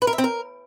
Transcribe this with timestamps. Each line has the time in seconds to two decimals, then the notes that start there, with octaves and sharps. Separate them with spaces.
0.02 B4
0.07 A#4
0.13 E5
0.18 C4
0.24 A#4